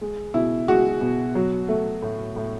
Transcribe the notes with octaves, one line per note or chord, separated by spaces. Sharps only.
G#3
B2 E4
G#3 F#4
B2
F#3
A3
A2
A2